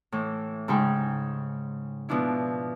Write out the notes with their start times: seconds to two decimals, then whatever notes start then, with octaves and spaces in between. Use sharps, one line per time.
0.12 A2 E3
0.68 G#2 C#3 D#4 G#4 G5
2.09 B2 F3 D4 E4